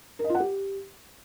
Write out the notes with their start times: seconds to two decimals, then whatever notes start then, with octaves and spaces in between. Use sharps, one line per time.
0.19 A#4
0.24 D#5
0.29 F4
0.35 F#5
0.40 G4